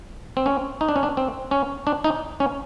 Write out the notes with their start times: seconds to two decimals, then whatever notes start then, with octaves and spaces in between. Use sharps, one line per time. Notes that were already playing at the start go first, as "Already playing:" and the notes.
0.37 C4
0.46 C#4
0.81 D#4
0.89 D4
0.96 C#4
1.03 D4
1.17 C4
1.51 C#4
1.87 D4
2.04 D#4
2.40 C#4